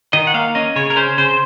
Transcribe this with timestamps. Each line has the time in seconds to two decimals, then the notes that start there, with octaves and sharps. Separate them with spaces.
0.13 D#3 D#5
0.27 F#5
0.34 A#3 F5
0.55 C#4 D#5
0.76 C#3 C#5
0.90 A#4
0.97 C#4 C5
1.18 C#3 C5